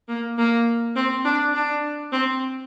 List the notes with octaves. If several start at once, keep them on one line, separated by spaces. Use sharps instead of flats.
A#3
A#3
C4
D4
D4
C4